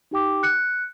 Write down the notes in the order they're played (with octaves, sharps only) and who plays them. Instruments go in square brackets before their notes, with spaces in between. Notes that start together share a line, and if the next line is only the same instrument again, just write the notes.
[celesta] D#4 G4 G5 D6
F#6 C#7